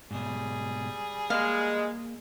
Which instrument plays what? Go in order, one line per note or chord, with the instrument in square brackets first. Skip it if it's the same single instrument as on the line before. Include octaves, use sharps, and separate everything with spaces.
[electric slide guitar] G#2 B2 [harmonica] G3 G#4
[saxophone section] G#3 [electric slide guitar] A#3 [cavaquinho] F5